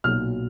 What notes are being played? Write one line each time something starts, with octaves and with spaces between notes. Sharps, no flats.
B1 A#2 F#3 F6